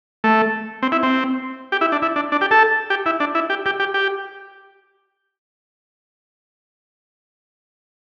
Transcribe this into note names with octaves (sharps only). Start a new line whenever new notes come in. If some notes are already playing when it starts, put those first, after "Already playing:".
A3
C4
E4
C4
G4
E4
D4
E4
D4
D4
G4
A4
G4
E4
D4
E4
G4
G4
G4
G4